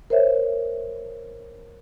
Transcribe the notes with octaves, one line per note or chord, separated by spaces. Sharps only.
A#4 C5 C#5 E5